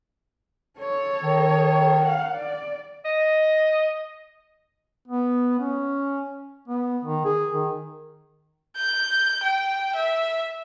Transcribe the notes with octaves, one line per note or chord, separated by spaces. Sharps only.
A4 C#5
D#3
F5 F#5
D5
D#5
B3
C#4
B3
D#3
G#4
D#3
G6
G5
E5